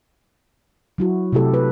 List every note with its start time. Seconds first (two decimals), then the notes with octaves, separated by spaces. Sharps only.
0.98 F#3 E4 F#4
1.33 C3 A3 E4 G4 A4
1.54 B4